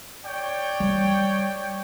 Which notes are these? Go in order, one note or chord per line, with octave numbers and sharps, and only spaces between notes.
C#5 D5 G5
G3